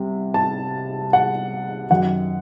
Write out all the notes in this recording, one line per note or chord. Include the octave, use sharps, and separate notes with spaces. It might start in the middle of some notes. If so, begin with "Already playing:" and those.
Already playing: C2 C3
A5
F#5
F#2 D#3 F#5